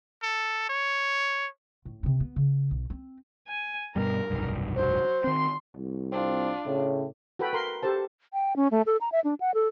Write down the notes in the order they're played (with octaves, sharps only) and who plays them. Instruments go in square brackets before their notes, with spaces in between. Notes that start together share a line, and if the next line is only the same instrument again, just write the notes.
[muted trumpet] A4
C#5
[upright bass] A2
C3 C4
B3
C#3
B1
C4
[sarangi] G#5
[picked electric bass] G2 B2 G3 [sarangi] A#4
[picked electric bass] F1 B1 G2
[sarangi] F#3 [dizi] C5
[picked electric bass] D#3 C4 [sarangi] C6
[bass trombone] C2
[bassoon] C4 [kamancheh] D4 F4
[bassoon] A2 [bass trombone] C#3
[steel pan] F#4 A4 B4 G5 B5
A#4 C6
G4 A4 C5 A5
[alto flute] G5
C#4
A3
A4
A#5
E5
D4
F#5
A4